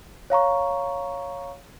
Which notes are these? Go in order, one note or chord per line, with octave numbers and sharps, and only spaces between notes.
C#5 F5 A#5 C#6